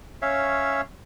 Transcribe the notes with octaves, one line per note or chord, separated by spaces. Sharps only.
C#4 C#5 E5 F5